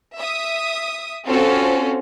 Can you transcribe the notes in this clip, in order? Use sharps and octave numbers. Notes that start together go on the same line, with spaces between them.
E5 D#6
C4 C#4 F4 F#4 A4